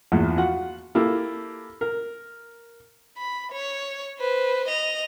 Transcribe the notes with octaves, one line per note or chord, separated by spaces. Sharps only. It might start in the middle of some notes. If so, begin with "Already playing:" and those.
A#1 E2
F4 F#4 F#5
A#3 E4 G4 A4
A#4
B5
C#5
B4 C5
D#5 F7